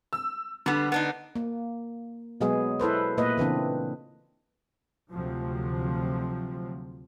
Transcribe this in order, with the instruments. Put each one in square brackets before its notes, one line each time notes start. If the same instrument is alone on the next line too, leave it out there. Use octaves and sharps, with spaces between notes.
[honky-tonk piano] E6
[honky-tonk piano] D3 [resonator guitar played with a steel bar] G3 B3
[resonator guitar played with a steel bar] B3 D4 D#4
[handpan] A#3
B2 F#3 G#3 B3 G#4
E4 A4 B4 C5
A#2 A3 A#3 B4 D#5
C#3 E3 C4 D4
[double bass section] D2 C3 F3 F#3